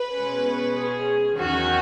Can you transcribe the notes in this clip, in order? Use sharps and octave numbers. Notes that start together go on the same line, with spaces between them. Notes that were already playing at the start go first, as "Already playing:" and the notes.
Already playing: B4
B2 G#3 C#4
G#4
E2 D#3 F#3 C#4 F#4